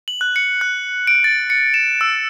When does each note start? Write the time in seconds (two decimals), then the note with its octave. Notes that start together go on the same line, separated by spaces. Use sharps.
0.08 F#7
0.21 F#6
0.36 C#7
0.61 F#6
1.07 D7
1.24 A6
1.50 C#7
1.74 E7
2.01 E6